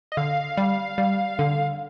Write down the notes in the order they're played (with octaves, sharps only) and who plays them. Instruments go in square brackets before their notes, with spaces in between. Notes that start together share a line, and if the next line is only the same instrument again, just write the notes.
[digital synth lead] D#5
[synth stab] D3 [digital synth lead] F5
[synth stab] G3
G3
D3